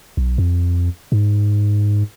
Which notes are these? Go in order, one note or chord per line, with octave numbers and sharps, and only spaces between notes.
B1
F2
G#2